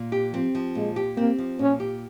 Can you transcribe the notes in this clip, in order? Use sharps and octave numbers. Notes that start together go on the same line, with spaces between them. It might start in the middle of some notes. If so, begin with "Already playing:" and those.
Already playing: A#2
G4
F3 C4
F3
A#2 G#3
G4
A#3 C4
F3
A#2 C#4
G4